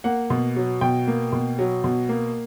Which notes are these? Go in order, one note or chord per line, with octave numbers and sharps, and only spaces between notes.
A#3 F#5
B2
F#3
B2 G5
A#3
B2
F#3
B2
A#3